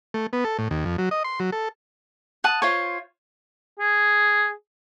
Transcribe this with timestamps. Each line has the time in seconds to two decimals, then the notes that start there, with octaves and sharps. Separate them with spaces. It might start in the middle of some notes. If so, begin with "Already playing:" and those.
0.14 A3
0.33 B3
0.45 A4
0.59 A2
0.71 D#2
0.85 F2
0.98 F#3
1.11 D#5
1.24 C6
1.40 F#3
1.52 A4
2.44 F#5 A5 D#6
2.62 F4 C5 C#5
3.79 G#4